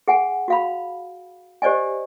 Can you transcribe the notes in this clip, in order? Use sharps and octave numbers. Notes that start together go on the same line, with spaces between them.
G#4 F#5 G#5
F#4 F5 B5
G4 C5 D5 D#5 G#5